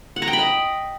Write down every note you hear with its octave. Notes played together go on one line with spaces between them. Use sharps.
F#5
A#5
G5
B5
D#5